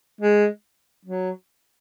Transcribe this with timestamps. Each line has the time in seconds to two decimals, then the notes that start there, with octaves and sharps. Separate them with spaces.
0.21 G#3
1.05 F#3